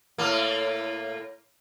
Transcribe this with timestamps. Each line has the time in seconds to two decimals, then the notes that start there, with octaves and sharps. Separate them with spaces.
0.18 A2 A#3